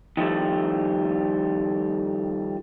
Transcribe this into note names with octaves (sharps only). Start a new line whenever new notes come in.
D#3 F3 G3 A3